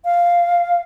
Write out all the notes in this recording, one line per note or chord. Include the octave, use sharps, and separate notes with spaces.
F5